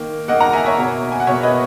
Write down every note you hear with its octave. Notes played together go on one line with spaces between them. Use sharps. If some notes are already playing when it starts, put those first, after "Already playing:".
Already playing: D#3 A#3
D#3 A#3 D#5 F#5
F#5 A#5
E5 G#5
C#5 E5
B2 A#3
G#5
F#5
B2 A#3 C#5 E5
B4 D#5